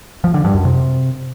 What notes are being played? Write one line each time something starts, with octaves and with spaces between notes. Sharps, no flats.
F3
D3
G2
F#2
C3